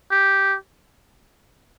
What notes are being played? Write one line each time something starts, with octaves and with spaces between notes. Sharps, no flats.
G4